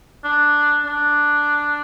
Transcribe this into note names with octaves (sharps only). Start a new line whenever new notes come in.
D4
D4